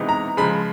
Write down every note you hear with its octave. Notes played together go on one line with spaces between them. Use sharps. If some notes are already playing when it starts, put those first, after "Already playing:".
Already playing: C3 E3 G#3 B3 D#4
A#5
C#3 F3 G#3 B5